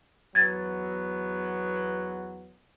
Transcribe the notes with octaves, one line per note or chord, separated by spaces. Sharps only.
E2 F#3 B3 G#6 A6